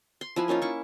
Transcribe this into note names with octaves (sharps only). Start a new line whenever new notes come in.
C6
F3 E4 B4 G#5
A#3 C#4 D#4 F4
E4 C#6